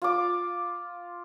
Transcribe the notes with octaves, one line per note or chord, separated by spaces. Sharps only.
F4 D6